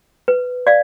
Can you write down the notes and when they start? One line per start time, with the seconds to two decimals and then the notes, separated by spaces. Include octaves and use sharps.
0.28 B4
0.67 D5 F5